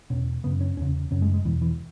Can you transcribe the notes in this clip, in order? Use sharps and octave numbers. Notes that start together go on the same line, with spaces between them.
E2 B2 C#4
F#2 C#3 B3
C#4
E2 C#3 C#4
F#2 C#3 C#4
G#3
G#3
E2 B2 E3
E3